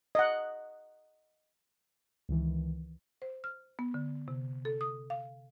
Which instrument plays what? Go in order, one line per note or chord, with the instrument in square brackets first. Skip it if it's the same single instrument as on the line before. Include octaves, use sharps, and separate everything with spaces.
[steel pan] D#5 F#5
[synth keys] C#2 D#3 E3
[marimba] C5
F6
B3
D3
C3
A4
D#6
F5